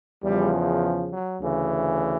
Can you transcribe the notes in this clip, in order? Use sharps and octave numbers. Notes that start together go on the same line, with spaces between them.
E2 C#3 F3 G3
F#3
D2 C#3 E3